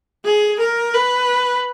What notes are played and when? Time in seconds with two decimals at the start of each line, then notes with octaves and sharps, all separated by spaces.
0.25 G#4
0.60 A#4
0.94 B4